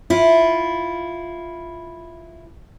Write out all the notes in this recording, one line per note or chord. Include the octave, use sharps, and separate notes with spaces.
E4 F4